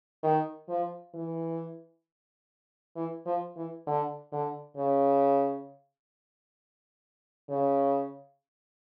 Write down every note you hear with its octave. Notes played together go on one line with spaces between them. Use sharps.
D#3
F3
E3
E3
F3
E3
D3
D3
C#3
C#3